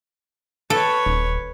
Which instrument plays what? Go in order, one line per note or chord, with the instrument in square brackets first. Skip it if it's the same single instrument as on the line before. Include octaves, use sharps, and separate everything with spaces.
[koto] A4 [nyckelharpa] B4 C#5
[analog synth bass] D#1